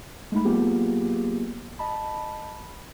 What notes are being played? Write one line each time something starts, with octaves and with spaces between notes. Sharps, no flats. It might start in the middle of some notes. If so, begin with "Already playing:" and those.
G#3 A3 D#4 B5
F#3 A#3 B3 F4 G4 G#4
D#5 A5 B5